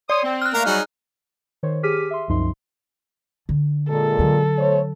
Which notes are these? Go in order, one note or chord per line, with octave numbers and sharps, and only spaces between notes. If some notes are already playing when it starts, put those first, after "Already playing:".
C#5 D5 C6 D#6
C4
F6 F#6
A3 A#3 A#4 F5 A#5
F#3 G3 D#4 F#4 G#4
D#3 C5 C#5
G4 G#4 D6 F6 B6 D#7
E5 C6
C2 F#2 F3 D#4 C6
D3
A#2 G#3 A4
D3 F#3
A3 C5 C#5